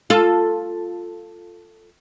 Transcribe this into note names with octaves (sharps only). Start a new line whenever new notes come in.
F4 A4